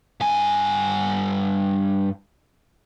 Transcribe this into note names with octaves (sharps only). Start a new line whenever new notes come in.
G2 G#5